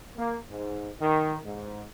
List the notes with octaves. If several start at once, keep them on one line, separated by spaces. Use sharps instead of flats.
A#3
G#2
D#3
G#2